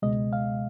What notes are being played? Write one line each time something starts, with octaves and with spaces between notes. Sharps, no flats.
C#2 B2 G#3 D#5
F5